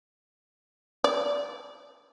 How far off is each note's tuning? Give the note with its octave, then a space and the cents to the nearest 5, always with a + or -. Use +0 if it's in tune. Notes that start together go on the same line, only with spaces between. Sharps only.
D5 -20